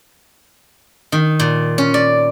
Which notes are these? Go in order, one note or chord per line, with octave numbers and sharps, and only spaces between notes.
D#3
A#2
C#4
D5